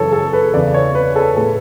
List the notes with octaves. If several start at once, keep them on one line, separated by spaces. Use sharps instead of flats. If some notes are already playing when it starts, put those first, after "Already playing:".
Already playing: F#2 C#3 E3 A4 C#5
A4
B4
E2 C#3 E3 D5
C#5
B4
A4
A2 E3 A4